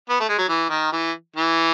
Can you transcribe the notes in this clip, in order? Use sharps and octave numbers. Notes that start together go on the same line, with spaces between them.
B3
A3
G#3
F#3
E3
D#3
E3
E3